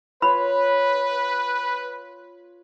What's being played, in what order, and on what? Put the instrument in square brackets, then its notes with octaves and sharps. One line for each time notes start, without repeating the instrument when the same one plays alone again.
[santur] F4 C#5 C6 [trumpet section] B4 [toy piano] B5